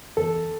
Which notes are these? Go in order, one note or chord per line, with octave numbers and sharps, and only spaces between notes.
E2 A4